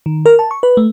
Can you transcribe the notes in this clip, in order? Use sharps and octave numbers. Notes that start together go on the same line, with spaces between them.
D#3
A#4
A5
C#6
B4
A3